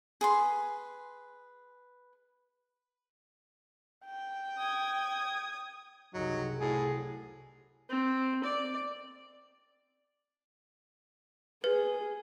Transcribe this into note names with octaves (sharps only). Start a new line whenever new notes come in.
G#4 B4 C6
G5
D#6 G#6
F#1 C2 F#3 D#4
A2 F#4 G#4 C5
C4
D5
G#4 B4